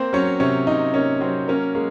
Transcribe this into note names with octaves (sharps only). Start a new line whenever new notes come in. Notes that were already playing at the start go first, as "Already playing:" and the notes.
Already playing: A#3 C4 C5
F#3 C#4 C#5
C3 C#4 C#5
C3 D#4 D#5
A#3 C#4 C#5
F#3 C4 C5
A#3 C#4 A#4
G#3 A#3